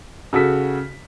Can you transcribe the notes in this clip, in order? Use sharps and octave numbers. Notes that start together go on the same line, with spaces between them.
C#3 F#4 A4 B6